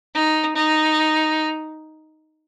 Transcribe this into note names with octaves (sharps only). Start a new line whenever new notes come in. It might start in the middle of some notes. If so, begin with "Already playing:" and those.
D#4
D#4